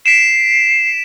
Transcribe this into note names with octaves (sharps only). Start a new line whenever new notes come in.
B6 C7 D7 E7